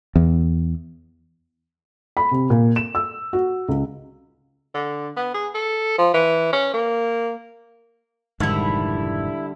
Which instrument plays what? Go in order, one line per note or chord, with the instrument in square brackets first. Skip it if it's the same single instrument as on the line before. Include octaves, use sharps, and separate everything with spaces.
[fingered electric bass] E2
[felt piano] B5
C3
A#2
E7
E6
F#4
C#2
[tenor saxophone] D3
B3
G#4
A4
F3
E3
C#4
A#3
[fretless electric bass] F1 G#2 D#3 [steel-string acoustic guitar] D3 G3 [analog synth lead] E4